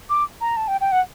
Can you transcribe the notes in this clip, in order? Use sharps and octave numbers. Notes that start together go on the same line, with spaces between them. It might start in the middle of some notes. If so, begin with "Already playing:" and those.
D6
A#5
A5
G5
G5
F#5